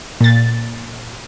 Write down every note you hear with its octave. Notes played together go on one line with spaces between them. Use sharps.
A#2 A6